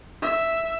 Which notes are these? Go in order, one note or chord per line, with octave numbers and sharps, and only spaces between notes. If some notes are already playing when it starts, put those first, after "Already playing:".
E5